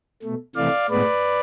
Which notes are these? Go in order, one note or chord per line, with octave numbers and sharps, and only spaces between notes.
B2 A3
C3 E3 A3 D5 F5
A2 G#3 B3 B4 D5